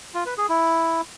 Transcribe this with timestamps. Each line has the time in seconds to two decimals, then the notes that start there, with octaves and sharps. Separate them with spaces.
0.14 F4
0.26 B4
0.38 G#4
0.49 E4